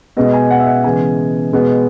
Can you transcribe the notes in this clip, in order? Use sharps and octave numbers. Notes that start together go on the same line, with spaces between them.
B2 G#3 B3 D#5
G#5
F#5
E5
F#5
C#3 E3 G#3 B3 G#5
B2 G#3 B3